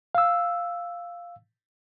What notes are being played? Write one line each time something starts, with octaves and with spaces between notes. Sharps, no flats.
F5 E6